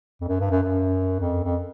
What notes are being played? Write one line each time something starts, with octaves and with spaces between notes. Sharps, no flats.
F2
F#2
G2
F#2
F#2
F2
F2